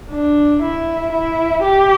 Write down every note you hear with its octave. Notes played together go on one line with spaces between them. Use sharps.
D4
E4
E4
G4